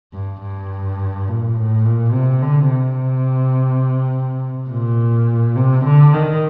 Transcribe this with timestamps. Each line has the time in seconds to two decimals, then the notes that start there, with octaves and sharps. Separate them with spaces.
0.14 G2
0.42 G2
1.28 A#2
1.56 A2
1.85 A#2
2.13 C3
2.42 D3
2.70 C3
4.70 A#2
5.56 C3
5.84 D3
6.13 D#3